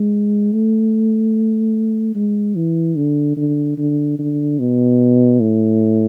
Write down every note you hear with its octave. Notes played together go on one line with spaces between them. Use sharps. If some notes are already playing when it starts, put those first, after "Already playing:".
Already playing: G#3
A3
G#3
E3
D3
D3
D3
D3
B2
A2